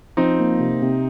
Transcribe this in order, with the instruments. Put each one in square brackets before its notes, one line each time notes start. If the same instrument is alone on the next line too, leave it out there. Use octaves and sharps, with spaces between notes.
[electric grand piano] F3 [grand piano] C4 D#4
[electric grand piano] A#3
C3
C3